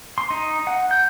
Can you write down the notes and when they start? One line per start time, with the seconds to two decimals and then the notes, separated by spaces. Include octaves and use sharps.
0.18 C6
0.31 D#4
0.67 F#5
0.91 G6